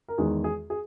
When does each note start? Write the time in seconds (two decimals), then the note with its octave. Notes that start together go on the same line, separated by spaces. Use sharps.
0.08 A#4
0.18 E2 D#3 G#3 G#4
0.44 G#4
0.70 G#4